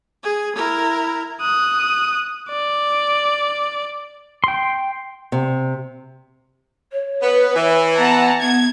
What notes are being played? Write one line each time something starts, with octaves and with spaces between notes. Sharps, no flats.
G#4
E4 A#4
D#6 F#6
D5
G5 C6
C3
C#5
B3 B4
E3
B3 F#5 A5 A#5
B3 G#6